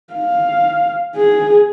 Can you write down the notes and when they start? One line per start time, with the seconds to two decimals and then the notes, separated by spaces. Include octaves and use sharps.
0.14 F5
1.16 G#4